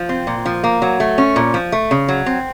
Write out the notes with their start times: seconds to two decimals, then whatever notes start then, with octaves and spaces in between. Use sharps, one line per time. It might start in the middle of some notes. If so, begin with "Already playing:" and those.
Already playing: F3
0.09 C4
0.27 A#2
0.46 F3
0.64 A#3
0.82 F#3
1.00 A3
1.18 C#4
1.36 A#2
1.54 F3
1.72 A3
1.91 C#3
2.08 F#3
2.26 C4